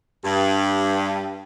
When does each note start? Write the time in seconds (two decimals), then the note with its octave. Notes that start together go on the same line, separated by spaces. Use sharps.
0.25 G2